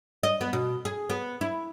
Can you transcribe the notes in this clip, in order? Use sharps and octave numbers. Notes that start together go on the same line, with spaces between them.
D#5
B3
B2
G#4
B3
E4